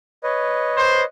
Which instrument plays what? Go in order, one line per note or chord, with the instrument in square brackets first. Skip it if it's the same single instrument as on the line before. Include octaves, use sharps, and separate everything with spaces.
[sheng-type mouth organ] B4 C#5 D#5
[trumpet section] C5